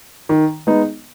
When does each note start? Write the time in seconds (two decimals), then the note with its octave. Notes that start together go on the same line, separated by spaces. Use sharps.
0.29 D#3
0.67 G#3 B3 D#4